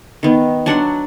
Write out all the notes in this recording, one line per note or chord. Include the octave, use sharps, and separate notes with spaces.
D#3 B3
F#3 D4 F#5 C6